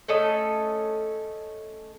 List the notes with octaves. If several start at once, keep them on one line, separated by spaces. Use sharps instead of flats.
A3 C#4 A4 D#5